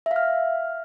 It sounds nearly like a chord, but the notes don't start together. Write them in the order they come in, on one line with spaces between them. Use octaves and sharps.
E5 F5 F6